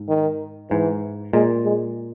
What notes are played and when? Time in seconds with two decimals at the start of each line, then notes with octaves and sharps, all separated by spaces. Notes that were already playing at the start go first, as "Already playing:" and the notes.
Already playing: G#2
0.09 D#3
0.71 G#2 E3
1.33 A#2 G#3
1.65 G#3